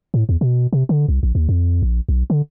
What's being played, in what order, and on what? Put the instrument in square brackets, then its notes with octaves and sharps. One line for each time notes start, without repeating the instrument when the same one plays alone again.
[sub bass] A2
E2
B2
C3
D3
C2
A#1
D#2
F2
A#1
B1
D3